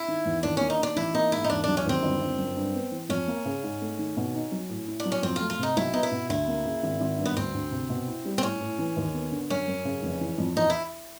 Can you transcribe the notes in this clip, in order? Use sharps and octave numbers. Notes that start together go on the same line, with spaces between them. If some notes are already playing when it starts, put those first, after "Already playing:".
Already playing: E4
D#3
E2
D#2 D4
A#3 C#4
D#4
D#3 D4
A1 E4
A#3 D#4
G#2 E4
D#4
E1 D4
F#3 D4
C#4
D#2 C4
G1
G1
F#2
G2
B3
E3
F2 C#4
A#3
C#3
G#2
A3
D#3
B2
D#4
F#3
A2
E4
D4
F#3
C#4
F2 C4
A3 F4
F4
C3 D#4
B1 E4
B3 D#4
E4
B2
D2 E4
A#3
C#3
G#1
G#1
G2
B3
D2 C4
D2
C3
B2
E4
G3
C4
A2 C#4
A2
E3
D#2
B3
D3
F#2 C#4
F#2
C#3
F1
E3
F2
E2 D#4
E4